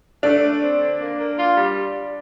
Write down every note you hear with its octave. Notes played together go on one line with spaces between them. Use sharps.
A3 D4
A3
C4
D3
A#3
A#3
F4
G3